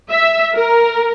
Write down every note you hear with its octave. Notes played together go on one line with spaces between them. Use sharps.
E5
A#4